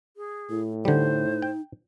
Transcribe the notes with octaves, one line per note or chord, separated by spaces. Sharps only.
G#4
A2 E4
D3 G3 D#4 C5
G5